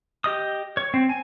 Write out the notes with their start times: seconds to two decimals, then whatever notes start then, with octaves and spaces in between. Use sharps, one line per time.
0.24 G4 D#5 D#6
0.77 C#5
0.94 C4
1.09 G#5